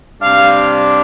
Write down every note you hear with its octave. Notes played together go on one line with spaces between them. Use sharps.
C3 G3 D4 F5